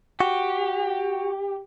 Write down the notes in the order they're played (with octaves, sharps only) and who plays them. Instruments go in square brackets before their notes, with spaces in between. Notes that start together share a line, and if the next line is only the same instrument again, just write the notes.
[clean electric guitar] F#4 [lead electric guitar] G4